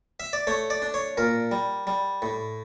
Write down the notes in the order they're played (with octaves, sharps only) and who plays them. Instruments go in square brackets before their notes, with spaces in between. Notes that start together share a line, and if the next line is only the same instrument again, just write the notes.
[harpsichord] E5
D5
A3 C#5
D5
D4
C#5
A#2 A#4
G3
G3
A2